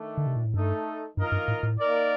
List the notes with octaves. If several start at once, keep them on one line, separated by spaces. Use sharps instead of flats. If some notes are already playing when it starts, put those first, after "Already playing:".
Already playing: D#3 A3 D4
D3
C3
A#2
A2
G2 A3 D#4 A4
G2 D#3 A#3 F4 A#4 D#5
G2
A2
A2
A#3 D#4 A#4 D5